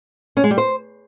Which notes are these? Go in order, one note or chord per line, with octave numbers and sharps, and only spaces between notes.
C#4
G#3
G3
C5